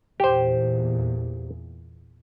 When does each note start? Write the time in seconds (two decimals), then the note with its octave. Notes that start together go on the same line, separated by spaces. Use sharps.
0.20 E2 A#2 G4 C5